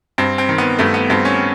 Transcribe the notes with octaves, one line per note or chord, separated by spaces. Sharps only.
G2 C4
C4
D#3
B3
G2 A3
B3
G2 C4
C#4